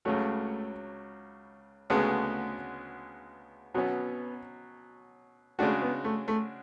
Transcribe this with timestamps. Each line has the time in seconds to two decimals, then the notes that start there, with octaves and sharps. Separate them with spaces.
0.05 C#2 C#3 F#3 A3
1.90 D2 C#3 G#3 A3 B3
3.74 B2 F#3 B3 C#4
5.59 C#3 G#3 A3 D4 F#4
5.81 B3
6.04 A3
6.28 A3